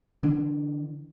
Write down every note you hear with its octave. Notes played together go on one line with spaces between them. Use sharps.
D3 E3 D4